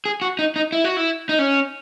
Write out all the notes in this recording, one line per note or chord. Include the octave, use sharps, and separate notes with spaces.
G#4
F#4
D#4
D#4
E4
F#4
E4
D#4
C#4